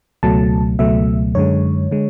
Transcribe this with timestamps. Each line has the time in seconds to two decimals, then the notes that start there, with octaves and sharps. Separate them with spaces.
0.23 C#2 B2 F#3 A3 A5
0.79 C#2 B2 F#3 A3 E5
1.35 F#2 D3 G#3 C#5
1.91 D3 G#3